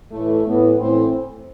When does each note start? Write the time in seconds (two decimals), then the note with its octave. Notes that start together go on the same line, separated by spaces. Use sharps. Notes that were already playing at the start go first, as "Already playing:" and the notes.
0.11 A2 E3 A3
0.44 A2 E3 B3
0.77 A2 E3 C4